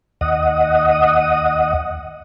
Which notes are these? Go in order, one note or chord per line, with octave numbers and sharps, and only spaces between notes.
D#2 D#5 F#5 D#6